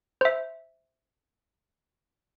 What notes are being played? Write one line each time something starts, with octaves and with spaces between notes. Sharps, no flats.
C5 E5